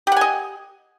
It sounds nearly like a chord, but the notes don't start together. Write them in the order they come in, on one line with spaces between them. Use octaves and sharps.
G4 F#5 G#5 D#5